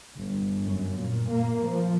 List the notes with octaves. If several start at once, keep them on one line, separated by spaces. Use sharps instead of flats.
G1
F#2
A#2
A#3
F3